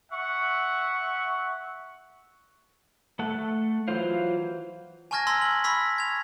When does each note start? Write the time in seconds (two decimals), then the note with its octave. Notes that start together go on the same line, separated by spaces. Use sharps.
0.11 E5 F#5 C#6
3.19 A3 A4 F#5
3.88 E3 F#3 F4 C5 F5
5.11 G#5 A5 C#6 F6 G#6 A#6
5.27 A#5 C6 E6 A#6 B6 G7
5.42 F#7
5.64 B5 C#6 E6 A#6 B6
5.98 G#6 F7